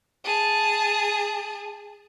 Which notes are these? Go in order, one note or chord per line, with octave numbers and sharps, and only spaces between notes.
G#4 A5